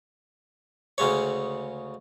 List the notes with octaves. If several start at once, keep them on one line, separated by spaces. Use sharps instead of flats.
D2 C#3 G#3 C#5